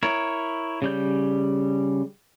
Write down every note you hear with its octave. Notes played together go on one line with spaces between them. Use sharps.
E4 A#4 C#5
C#3 G3 G6